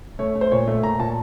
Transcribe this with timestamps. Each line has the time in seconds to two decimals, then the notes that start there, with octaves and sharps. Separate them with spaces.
0.19 A3 C#5
0.35 A3
0.41 C5
0.51 A#2 C#5
0.67 A3
0.83 A#2 A#5
0.99 A#2 A5